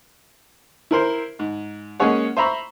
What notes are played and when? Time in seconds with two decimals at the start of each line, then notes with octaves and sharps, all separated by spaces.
0.91 E4 A#4 C5
1.39 G#2
2.00 G#3 A#3 C#4 G#4 C#5 F#5
2.37 C5 E5 A#5 B5 C#6